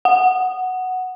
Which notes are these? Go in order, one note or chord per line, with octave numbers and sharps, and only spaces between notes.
F#5